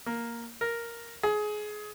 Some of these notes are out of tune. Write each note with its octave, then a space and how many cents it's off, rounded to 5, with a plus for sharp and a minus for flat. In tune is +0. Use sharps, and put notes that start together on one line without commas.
A#3 +0
A#4 +0
G#4 +20